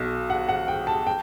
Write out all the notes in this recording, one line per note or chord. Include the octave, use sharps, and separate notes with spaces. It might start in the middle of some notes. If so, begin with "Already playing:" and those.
Already playing: B1 B2
F#5
F#5
G5
A5
G5